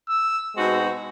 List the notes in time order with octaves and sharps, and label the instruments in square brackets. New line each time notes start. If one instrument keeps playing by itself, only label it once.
[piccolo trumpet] E6
[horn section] B2 G#3 C4 D#4 F#4